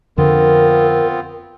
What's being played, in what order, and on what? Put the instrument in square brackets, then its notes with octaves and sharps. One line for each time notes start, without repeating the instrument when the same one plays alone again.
[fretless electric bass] F2 D3 [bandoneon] B3 C4 F4 [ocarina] A#4